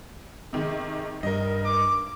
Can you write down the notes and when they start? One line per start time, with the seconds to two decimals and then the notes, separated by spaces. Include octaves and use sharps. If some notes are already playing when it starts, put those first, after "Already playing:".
0.53 C3 D#3 G#3
1.23 G2 A#4 D#5
1.65 D6